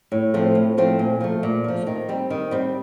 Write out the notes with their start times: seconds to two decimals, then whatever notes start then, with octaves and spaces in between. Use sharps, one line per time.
0.12 A2
0.34 F3 A3 C4
0.55 A2
0.77 F3 A3 C4
0.99 A#2
1.21 F3 A3
1.43 A#2
1.64 F3 A3
1.87 D#3
2.09 G3 C4
2.30 D#3
2.51 G3 C4